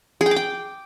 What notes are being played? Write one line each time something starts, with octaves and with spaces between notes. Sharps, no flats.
G#4
G5
D6
G5